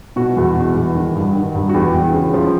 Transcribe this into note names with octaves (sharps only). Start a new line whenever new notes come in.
B2 F#4
E2
B2
E2
D#3
G2
D#3
G2
F#4
E2 G4
E2
C#3
F3